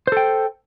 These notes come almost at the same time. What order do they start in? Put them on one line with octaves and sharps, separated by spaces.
C5 A4 G5